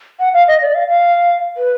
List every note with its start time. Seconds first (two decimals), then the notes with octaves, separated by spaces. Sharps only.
0.19 F#5
0.34 F5
0.48 D#5
0.62 D5
0.74 F5
0.88 F5
1.57 B4